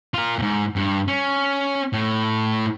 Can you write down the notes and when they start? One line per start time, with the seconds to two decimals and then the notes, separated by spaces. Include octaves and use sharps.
0.14 F4 A#4
0.39 E2 G#2
0.76 G2
1.08 C#4
1.93 A2